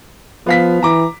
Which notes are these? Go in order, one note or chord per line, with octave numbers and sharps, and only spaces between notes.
F3 B3 F5 B6
E3 A#5 D6